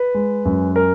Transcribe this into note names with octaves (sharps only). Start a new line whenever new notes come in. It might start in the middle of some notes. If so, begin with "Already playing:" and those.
Already playing: B4
G#3
F#2
A#4